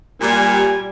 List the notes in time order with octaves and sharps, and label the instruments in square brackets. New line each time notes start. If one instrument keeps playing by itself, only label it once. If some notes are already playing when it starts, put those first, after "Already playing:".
[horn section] A#2 [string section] G3 [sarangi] G#5